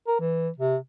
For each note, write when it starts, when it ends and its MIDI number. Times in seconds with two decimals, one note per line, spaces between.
0.07 0.16 70
0.20 0.49 52
0.58 0.76 48